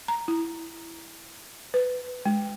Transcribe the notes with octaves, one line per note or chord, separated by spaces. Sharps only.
A#5
E4
B4
G#3